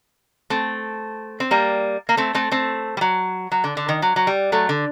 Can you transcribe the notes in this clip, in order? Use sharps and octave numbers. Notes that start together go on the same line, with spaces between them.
A3 C4
C4
G3 A#3
A#3
A3 C4
A3 C4
A3 C4
G3
F#3
F#3
D3
D3
D#3
F#3
F#3
G3
F#3 A3
D3